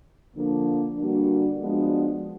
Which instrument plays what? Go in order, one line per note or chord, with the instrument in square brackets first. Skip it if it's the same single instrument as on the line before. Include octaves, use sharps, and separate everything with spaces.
[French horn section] D3 F3 A#3 D4
D3 G3 A#3 D4 F#4
F3 G#3 B3 D4 F#4